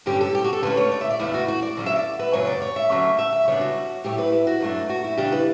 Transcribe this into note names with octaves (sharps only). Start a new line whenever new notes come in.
G2 D3 G3 C#4 G4
A4
G4
F#4
A4
D3 A3 C#4 B4
C#5
D5
E5
D5
E2 C#3 E3 A3 D4 E4
F#4
F#4
D5
D3 F#3 C#4
E5
D5
B4
F#2 C#3 F#3 B3 C#5
D5
C#5
E5
D3 F#3 A3 C#4
E5
E5
C#3 G3 B3 D4 C#5
F#4
A2 F#3 A3 G4
B4
E4
F#4
G2 F#3 A3 D4
F#4
E4
C#3 E3 G3 D4 G4
B4